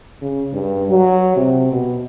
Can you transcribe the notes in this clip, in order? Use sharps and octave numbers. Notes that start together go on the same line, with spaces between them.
C#3
G2
F#3
C3
B2